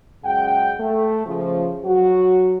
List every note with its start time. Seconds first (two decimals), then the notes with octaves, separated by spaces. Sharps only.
0.24 F#2 C#3 G#3 F#5 G5
0.80 A3
1.26 C#3 F3
1.85 F#3 F#4